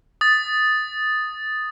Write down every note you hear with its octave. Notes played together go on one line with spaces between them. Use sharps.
D#6 A6